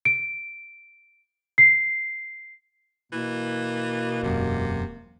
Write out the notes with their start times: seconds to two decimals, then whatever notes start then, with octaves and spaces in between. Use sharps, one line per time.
0.05 D7
1.58 C7
3.12 B2 E3 A#3
4.23 E1 F#2 C3